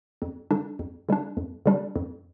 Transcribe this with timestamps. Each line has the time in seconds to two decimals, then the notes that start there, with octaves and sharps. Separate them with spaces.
0.22 F2
0.51 D3 G3 D4
0.79 F2
1.09 D3 G3 D4
1.37 F2
1.66 D3 G3 D4
1.96 F2